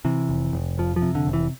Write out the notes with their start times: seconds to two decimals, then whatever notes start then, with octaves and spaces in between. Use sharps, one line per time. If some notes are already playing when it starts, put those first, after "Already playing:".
0.05 C3 E3
0.29 F1
0.53 F1
0.78 F2 F3
0.96 F3
1.02 C3
1.15 D3
1.27 F1
1.33 E3